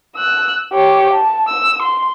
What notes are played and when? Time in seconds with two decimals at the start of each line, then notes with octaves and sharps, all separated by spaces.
0.16 E6 F#6
0.73 G4 C#5
1.13 A5
1.48 E6
1.82 C6